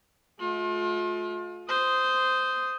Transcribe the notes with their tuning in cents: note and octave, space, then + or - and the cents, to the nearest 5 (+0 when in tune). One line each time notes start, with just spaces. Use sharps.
A3 -40 F4 +35
C5 -10 D#6 +5